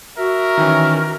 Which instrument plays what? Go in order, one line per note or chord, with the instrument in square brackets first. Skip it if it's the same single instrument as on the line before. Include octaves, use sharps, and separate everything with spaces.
[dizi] F#4 [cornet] A#4 [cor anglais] E5
[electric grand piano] D#3 E3 C#4